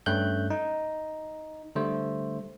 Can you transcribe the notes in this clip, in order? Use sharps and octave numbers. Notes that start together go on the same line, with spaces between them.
G2 A3 C#4 F#6 G6
D#4
D3 G3 A3 C5